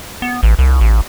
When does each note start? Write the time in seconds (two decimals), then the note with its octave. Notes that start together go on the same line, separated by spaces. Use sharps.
0.22 B3
0.43 A1
0.59 C2
0.81 A1